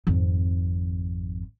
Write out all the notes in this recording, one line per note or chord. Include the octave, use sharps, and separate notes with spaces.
G#1 F2